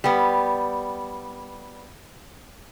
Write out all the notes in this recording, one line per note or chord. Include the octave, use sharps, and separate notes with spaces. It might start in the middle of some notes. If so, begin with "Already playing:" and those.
G3 B3